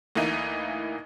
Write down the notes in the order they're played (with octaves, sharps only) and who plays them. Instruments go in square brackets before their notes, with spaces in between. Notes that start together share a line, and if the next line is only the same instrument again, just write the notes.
[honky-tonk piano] D2 E3 A#3 D#4 E4